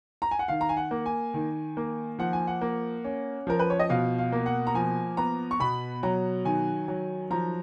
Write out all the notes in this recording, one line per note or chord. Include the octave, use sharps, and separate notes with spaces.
A#5
G#5
F#5
D#3 F5
A#5
G#5
F#5
A#3
G#5
D#3
A#3
F3 F#5
G#5
F#5
A#3
C#4
F3 A#4
B4
C#5
D#5
B2 F5
F5
A#3
F#5
A#5
F3 G#5
B3 A#5
C#6
B2 B5
F#3 A#5
D#3 G#5
F#3
F3 A#5